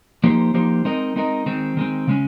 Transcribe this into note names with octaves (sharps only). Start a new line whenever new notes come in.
F3 A#3 D#4 G4 C5
F3 A#3 D#4 G4 C5
G#3 C4 D#4 A#4 D#5
G#3 C4 D#4 A#4 D#5
D#3 G#3 C4
D#3 G#3 C4
C#3 G#3 C#4